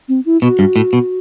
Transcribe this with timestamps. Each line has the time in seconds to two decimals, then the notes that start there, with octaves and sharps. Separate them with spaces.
0.08 C4
0.25 E4
0.42 B2 F#4
0.59 G2
0.76 A2
0.93 B2